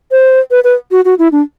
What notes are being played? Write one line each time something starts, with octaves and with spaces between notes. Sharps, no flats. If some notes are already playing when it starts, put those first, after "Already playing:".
C5
B4
B4
F#4
F#4
E4
D4